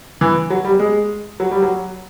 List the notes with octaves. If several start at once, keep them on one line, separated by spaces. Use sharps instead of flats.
E3
F#3
G3
G#3
F#3
G3
F#3